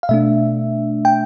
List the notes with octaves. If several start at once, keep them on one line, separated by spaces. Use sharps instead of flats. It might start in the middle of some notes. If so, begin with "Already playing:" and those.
F5
B2 A3 D4 E5
G5